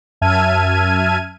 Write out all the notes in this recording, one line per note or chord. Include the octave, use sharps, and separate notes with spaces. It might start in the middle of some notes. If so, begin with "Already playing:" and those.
F#2 E5 A5 F6 G#6 D#7